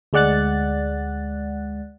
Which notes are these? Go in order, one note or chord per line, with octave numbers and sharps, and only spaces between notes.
D2 G#3 D5 F#5 F#6 A6